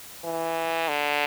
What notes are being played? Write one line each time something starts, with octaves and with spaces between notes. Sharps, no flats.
E3
D3